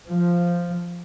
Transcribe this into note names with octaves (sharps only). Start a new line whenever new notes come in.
F3